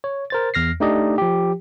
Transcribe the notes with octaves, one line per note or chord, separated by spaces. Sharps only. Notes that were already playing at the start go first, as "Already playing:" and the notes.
C#5
A#4 C5 A6
E2 F6 A#6 C7
A3 D4 D#4 G4 D5 D#5
F3 G4